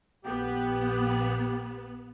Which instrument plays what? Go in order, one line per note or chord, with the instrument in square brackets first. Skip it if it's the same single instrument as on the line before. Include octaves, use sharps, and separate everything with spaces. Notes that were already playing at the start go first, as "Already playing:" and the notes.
[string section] A#1 B3 [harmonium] G4